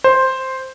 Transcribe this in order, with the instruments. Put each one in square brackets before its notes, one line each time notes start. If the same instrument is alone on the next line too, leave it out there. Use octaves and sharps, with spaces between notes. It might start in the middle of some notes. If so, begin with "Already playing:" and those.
[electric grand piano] C5